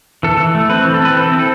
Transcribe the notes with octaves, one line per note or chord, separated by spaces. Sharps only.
E3 A4
E3
A3
C4 B4
E3
A4
C4 B4
E3 A4
C4
A4